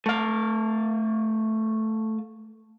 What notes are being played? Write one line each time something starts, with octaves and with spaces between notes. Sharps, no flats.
A3 F5